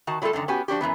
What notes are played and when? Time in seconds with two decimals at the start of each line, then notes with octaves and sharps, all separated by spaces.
0.07 D#3 F#4 A5
0.22 F#3 G3 A3 F4 A4
0.33 F#2 A2 D3 D#3
0.48 B3 C#4 F#4 G4 G#5
0.68 F3 D4 F#4 G4
0.81 F#2 A#2 E3 B3